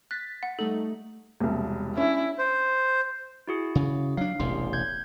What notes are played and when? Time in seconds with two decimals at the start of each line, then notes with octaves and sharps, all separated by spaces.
0.11 F#6 A6 B6
0.43 F#5
0.59 G3 A3 D#4 A4
1.40 E1 C2
1.97 C#4 D4 E4
2.38 C5
3.48 E4 F#4 G#4
3.75 C#3
4.17 F#3 D4 F5
4.39 E1 A1 C3 C6
4.73 G6 G#6